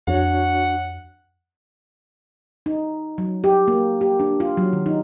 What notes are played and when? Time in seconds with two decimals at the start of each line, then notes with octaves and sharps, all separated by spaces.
0.07 F2 D4 F#4 C#5 F#5
2.66 D#4
3.18 F#3
3.44 G4
3.68 A#3
4.01 G4
4.20 D4
4.40 F4
4.57 F#3
4.73 D#3
4.86 D#4